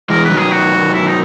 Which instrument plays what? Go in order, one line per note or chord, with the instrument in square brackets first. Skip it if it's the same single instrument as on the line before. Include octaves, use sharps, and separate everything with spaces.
[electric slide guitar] E3 G#3 [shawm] A#4
[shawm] B4
[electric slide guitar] D#3 F#3
[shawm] G#4
F#4
E4
D#4